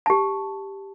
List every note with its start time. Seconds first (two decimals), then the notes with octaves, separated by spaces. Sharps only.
0.06 G4 A5